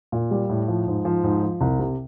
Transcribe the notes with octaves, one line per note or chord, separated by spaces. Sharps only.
A#2
G3
A2
F3
G#2
F3
G#2
F3
C2
C3